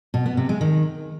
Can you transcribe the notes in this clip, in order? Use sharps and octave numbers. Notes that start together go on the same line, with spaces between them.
B2
B3
C3
G#3
D#3